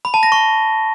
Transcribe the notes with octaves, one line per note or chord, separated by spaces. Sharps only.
B5
A5
A#6
C#6